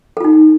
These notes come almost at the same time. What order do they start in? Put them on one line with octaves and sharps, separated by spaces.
A4 F4 D#4